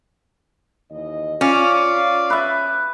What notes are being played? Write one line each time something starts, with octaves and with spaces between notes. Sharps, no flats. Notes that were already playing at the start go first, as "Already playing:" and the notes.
D#2 E3 D#5
C#4 F4 D5 F5
B4 E5